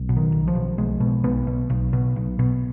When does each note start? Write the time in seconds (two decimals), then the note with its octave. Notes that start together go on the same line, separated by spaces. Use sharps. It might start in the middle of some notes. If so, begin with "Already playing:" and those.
Already playing: B1
0.09 B2
0.16 D#3
0.32 B1
0.48 F3
0.55 B2
0.78 B1 G#3
1.00 B2
1.24 B1 B3
1.47 B2
1.70 B1
1.93 B2
2.16 B1
2.39 B2